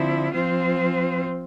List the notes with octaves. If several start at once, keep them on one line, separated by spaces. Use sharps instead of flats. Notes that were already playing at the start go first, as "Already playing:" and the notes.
Already playing: D3 F3 C4 E4
F3 C4 F4 C5